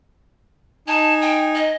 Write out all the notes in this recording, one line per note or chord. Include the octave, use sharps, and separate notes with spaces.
D#4 G#5 A5
G5
D#5